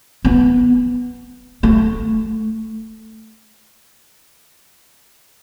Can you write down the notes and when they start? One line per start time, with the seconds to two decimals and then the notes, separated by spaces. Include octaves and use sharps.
0.25 B3
1.63 A3